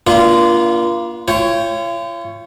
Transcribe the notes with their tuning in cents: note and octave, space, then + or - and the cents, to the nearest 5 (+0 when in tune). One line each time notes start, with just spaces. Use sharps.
A#3 +35 D4 +0 F4 -25
F4 -45 C#5 +0 G5 +0